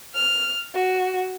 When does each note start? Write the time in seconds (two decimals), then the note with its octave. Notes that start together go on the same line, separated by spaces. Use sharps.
0.14 F6
0.74 F#4